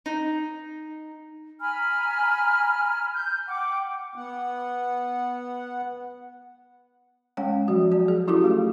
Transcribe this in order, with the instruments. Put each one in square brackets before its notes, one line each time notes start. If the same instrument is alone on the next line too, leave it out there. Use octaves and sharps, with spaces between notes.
[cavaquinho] D#4
[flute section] G#5 A#5 B5 F6
G6
F#5 G5 D6
[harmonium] B3 F#5
[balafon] G#3 C#4 C#5 F#5 G5
F3 F#3 F#4
F#4 D5
G#4
C#4 E4 F#4 G4 A4 D6
A3 F4 A4